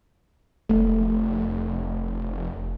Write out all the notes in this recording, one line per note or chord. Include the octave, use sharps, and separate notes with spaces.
F1 A3